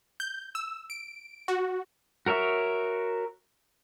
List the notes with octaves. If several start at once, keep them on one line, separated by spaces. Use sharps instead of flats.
G6
E6
D7
F#4
F#4 A#4 C#5 E5